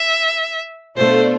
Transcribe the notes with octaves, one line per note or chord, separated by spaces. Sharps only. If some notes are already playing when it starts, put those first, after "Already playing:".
Already playing: E5
B2 A3 D4 F4 C5